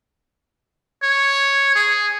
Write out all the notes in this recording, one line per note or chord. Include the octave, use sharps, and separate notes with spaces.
C#5
G#4